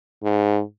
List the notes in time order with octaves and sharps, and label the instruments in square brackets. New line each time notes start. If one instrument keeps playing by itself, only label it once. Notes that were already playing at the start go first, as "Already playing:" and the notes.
[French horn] G#2